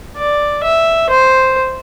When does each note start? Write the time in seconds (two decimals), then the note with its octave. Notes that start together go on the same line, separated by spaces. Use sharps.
0.17 D5
0.63 E5
1.09 C5